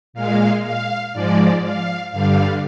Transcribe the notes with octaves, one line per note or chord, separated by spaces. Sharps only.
A#2 G#3 F5
F5
G#2 F3 G#3 D5
F5
G2 D3 G3 F5